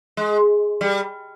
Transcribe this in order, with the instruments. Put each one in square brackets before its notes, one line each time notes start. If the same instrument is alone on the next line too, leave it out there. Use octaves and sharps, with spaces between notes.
[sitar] G#3
G3